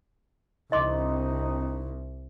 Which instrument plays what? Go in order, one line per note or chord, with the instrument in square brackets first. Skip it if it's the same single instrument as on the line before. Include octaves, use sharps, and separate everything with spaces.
[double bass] C2 [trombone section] C4 D4 D#4 [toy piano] D#5 C6 D6